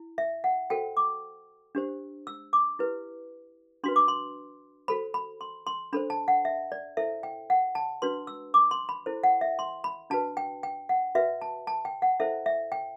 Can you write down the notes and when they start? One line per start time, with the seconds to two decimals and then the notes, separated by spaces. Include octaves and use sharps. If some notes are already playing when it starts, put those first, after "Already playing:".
Already playing: E4
0.18 E5
0.44 F#5
0.70 F#4 A4 C5 G5
0.97 D6
1.75 D4 G4 C5
2.27 E6
2.53 D6
2.79 E4 G4 B4
3.84 D4 F#4 B4 C6
3.96 D6
4.08 C6
4.88 F#4 A4 C5 B5
5.14 B5
5.41 C6
5.67 C6
5.93 D4 A4 C5 B5
6.10 A5
6.28 F#5
6.45 E5
6.72 D5
6.97 E4 A4 C5 E5
7.23 G5
7.50 F#5
7.75 A5
8.02 D4 F#4 B4 C6
8.27 E6
8.54 D6
8.71 C6
8.89 B5
9.06 E4 A4 C5
9.24 F#5
9.41 E5
9.59 C6
9.84 B5
10.10 D4 F#4 B4 A5
10.37 G5
10.63 G5
10.89 F#5
11.15 F#4 B4 E5
11.42 A5
11.67 A5
11.85 G5
12.02 F#5
12.20 E4 A4 C5 E5
12.46 E5
12.72 G5